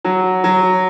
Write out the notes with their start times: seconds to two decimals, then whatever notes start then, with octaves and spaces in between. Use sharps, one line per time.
0.05 F#3
0.44 F#3